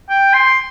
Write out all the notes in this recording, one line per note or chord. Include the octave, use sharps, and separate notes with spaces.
G5
C6